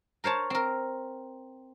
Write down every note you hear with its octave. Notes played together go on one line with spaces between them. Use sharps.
A#4 C5 C#5 A5
C4 A#4